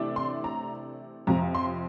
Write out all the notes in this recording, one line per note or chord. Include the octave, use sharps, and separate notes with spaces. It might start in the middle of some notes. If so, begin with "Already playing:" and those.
Already playing: C3 E3 A3 D4
C6
A#5
F2 C3 F3 A#5
C6